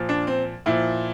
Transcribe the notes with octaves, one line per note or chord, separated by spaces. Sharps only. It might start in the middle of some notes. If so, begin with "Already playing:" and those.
Already playing: A#2 F3
D4
C4
A#2 F3 E4